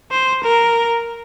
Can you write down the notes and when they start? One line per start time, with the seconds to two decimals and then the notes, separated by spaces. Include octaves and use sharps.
0.11 C5
0.43 A#4